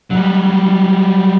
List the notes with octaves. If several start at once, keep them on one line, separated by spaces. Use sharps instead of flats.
F#3 G3